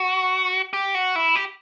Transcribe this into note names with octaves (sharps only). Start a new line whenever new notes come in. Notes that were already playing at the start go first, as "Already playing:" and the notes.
Already playing: F#4
G4
F#4
E4
G4